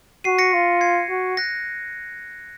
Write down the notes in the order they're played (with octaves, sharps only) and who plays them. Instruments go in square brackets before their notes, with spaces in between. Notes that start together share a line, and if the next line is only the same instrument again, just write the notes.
[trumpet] F#4 [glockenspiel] C7 D#7
[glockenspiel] A#6 C#7
[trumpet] F4
[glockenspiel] G#6 C7
[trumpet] F#4
[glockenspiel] F#6 A#6